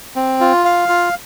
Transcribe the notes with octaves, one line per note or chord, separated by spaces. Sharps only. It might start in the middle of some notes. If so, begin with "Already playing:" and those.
C4
F4
F5
F4